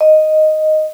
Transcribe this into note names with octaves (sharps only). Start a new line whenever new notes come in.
D#5